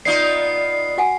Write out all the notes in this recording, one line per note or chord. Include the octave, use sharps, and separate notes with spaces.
B3 D#4 F4 D5 C7
F#4 F#5 G#5